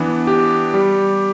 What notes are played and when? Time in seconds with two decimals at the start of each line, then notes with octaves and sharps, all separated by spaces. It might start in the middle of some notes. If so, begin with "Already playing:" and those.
Already playing: E3 B3 D4
0.27 G4
0.74 G3